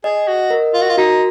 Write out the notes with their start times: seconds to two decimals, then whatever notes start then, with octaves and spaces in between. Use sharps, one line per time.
0.04 G#4 D#5
0.28 F#4
0.50 A#4
0.74 F4
0.81 F#4
0.89 F4
0.98 D#4 F#4